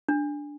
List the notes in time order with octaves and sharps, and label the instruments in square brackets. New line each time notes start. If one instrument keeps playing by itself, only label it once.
[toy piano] D4